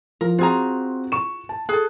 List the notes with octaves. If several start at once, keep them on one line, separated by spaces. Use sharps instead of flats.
F3 A#4
C4 F4 F#4 G#4 A#5
C#6 E7
A5
G#4 A4 F#6